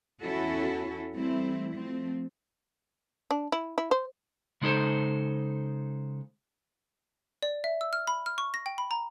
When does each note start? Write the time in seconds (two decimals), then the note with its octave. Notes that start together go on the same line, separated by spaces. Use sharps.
0.22 E2 C#4 E4 F#4 A4
1.16 E3 G3 A3 C4 E4
1.76 F3 A3 C4
3.31 D4
3.52 E4
3.78 E4
3.91 C5
4.62 C#3 G#3 D#4 A4 C5
7.43 D5
7.64 E5
7.81 E6
7.93 F6
8.07 B5
8.26 F6
8.38 C#6
8.54 A#6
8.66 G5
8.78 B5
8.91 A#5